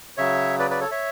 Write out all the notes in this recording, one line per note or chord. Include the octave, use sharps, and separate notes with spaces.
C#3 F#3 C#5 E5
B4 D5
B4 D5
A4 C#5
C#5 E5